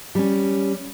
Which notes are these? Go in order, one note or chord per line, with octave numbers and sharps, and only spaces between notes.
G3 C#4